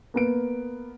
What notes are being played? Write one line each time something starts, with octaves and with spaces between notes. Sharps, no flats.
A#3 B3 D7